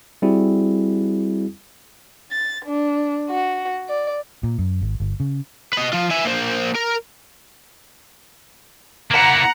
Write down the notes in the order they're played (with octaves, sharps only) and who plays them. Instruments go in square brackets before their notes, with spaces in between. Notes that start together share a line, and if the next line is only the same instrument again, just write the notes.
[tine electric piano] G3 C4 E4 F#4 G#4
[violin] A6
D4
F#4
D5
[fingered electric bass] A#2
F#2
G#1
G1
C#3
[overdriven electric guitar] B4 D#5
F3 F4
E5 G#5
A#3 C5
A#4
[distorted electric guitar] A#3 E4 [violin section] F#5 A#5